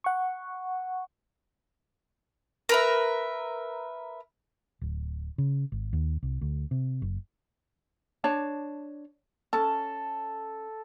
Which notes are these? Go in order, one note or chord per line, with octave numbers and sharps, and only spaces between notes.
F#5 C#6
A#4 B4 E5
D1
C#3
G#1
D#2
C2
D2
C3
F#1
D4 C#5 A5
C#4 A4 A5